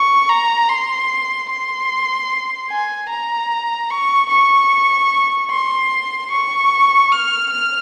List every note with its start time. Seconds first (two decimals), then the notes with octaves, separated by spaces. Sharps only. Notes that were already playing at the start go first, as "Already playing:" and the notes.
Already playing: C#6
0.29 A#5
0.69 C6
1.49 C6
2.70 G#5
3.10 A#5
3.90 C#6
4.29 C#6
5.50 C6
6.31 C#6
7.12 F6
7.51 F6